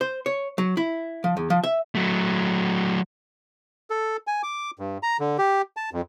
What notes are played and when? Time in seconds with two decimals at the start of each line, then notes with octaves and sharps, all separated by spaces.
0.01 C5
0.26 C#5
0.58 F#3
0.77 E4
1.24 F3
1.37 E2
1.50 F3
1.64 E5
1.95 F#3 A3
3.90 A4
4.27 G#5
4.43 D6
4.79 G2
5.03 A#5
5.20 D3
5.38 G4
5.77 A5
5.93 F2